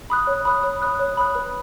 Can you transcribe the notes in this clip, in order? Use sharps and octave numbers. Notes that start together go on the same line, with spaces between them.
B5 D#6 F#6
C#5
B5 D#6 F#6
C#5
B5 D#6 F#6
C#5
B5 D#6 F#6
B4